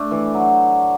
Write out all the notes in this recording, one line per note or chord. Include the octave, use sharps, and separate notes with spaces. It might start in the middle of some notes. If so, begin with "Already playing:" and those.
Already playing: A3 D4
E3
F#3